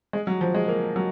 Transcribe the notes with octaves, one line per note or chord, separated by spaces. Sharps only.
G#3
F#3
F3
G#3
A#3
F#3